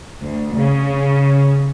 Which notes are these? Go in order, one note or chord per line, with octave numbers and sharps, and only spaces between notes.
D2
C#3